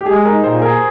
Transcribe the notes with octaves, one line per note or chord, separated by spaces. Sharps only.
G4
G#3 G#4
D#4 A#4
A#2 C5
G#4 A#4